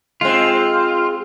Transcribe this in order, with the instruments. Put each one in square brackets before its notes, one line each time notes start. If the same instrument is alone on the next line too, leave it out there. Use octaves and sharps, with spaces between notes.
[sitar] G#3 C4 [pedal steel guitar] F4